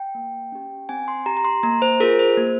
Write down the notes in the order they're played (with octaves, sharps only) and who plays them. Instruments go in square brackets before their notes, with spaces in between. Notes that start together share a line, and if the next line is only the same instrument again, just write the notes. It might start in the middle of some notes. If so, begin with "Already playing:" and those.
Already playing: [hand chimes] G5
A#3
C#4 G4
C4 G#5
C6
G4 A#5
A#5
C6
A#3 A#5
C5
F4 G#4 A#4
C5
A#3